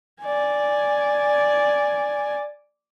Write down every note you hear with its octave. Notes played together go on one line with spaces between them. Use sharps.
D5 G#5